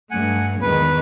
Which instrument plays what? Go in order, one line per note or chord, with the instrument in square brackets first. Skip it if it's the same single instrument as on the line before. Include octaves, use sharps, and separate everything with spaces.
[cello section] G2 A3 [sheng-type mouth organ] F#5 G#5
[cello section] E2 G#2 D#3 [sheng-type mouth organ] B4